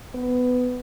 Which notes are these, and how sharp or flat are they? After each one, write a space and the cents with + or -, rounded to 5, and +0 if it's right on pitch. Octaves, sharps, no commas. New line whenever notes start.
B3 +15